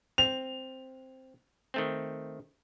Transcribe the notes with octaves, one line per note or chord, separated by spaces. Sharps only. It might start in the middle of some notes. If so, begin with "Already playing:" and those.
C4 F7
D#3 A3 C4